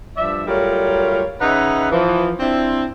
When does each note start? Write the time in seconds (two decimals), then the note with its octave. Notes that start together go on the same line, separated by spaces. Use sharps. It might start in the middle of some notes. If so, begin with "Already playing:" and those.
0.17 G2 F3 D5 E5
0.47 F#3 G3 A3 F4 A#4 C#5
1.41 C#3 D#4 B4 D#5 E5 F#5
1.92 E3 F3
2.40 C4 D4 E4